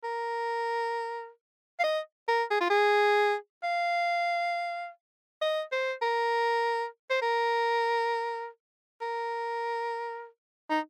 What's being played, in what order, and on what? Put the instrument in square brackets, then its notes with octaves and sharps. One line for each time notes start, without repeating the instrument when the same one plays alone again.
[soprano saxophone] A#4
F5
D#5
A#4
G#4
F4
G#4
F5
D#5
C5
A#4
C5
A#4
A#4
D#4